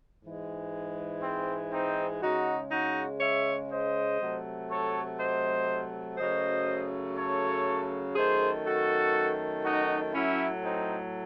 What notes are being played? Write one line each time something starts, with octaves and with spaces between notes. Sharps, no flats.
G#2 E3 G#3
C4
C4 D#4
C#3 G#3 D#4 F#4
D#4 F#4
C#5 E5
C5 D#5
C3 F#3 A3
A4 C#5
C5 D#5
F#2 C#3 F#3 A3 C5 D#5
A4 C#5
F#2 D#3 A3 G#4 C5
F#4 A4
D#4 F#4
A2 F#3 A3 C#4 E4
C4 D#4